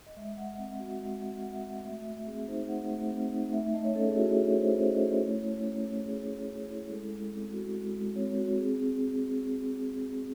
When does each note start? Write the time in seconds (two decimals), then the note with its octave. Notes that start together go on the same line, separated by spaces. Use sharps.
0.06 D#5
0.17 G#3 E5
0.37 G#3 F#5
0.58 C4
0.80 F#4
1.00 G#3
1.22 G#3
1.42 C4 F#5
1.53 E5
1.63 F#4
1.74 D#5
1.85 A3 E5
1.99 E5
2.05 A3
2.13 E5
2.27 C4 G#4
2.48 D#4 C5
2.69 A3 F#5
2.90 A3
3.11 C4
3.32 D#4
3.52 A3 E5
3.64 E5
3.74 A3 D#5
3.85 C#5
3.95 C#4 A4
4.06 G#4
4.16 E4 F#4
4.27 G#4
4.37 A3
4.47 C#5
4.58 A3 C5
4.79 C#4 C5
4.90 D#5
5.00 E4 C#5
5.11 C#5
5.22 A3
5.42 A3
5.63 C#4
5.84 E4
6.05 A3 G#4
6.27 A3
6.48 C#4
6.68 E4
6.89 G#3 A4
7.11 G#3
7.32 C4
7.52 F#4
7.74 G#3
7.95 G#3
8.16 C4 C#5
8.37 F#4
8.58 C4 G#4
8.79 C4